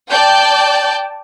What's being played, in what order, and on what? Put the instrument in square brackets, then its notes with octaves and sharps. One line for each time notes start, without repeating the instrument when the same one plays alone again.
[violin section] D5 G5 A5 G6